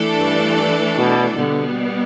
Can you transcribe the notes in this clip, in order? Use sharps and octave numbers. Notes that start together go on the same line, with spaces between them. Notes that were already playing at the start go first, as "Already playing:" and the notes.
Already playing: E3 A3 D4 A4 D5
G2
B2
B2 D3 G3 B3